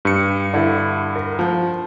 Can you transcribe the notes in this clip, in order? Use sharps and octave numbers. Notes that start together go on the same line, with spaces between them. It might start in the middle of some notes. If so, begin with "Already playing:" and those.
G2 C#7
D3 E4
A#4
F3